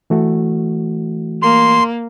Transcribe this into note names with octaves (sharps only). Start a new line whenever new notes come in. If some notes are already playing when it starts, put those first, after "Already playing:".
E3 A3 F#4
A#3 C6